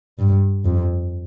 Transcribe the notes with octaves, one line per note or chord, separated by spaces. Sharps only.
G2
F2